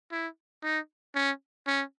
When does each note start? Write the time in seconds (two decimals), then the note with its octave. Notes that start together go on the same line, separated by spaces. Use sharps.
0.12 E4
0.63 D#4
1.15 C#4
1.67 C#4